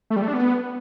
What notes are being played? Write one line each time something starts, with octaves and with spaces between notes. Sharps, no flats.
A3
G3
A3
D4
B3